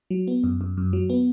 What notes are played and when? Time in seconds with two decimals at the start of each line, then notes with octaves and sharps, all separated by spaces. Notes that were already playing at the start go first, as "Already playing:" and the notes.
0.10 F#3
0.27 B3
0.44 F#2
0.61 F#2
0.77 F#2
0.93 F#3
1.10 B3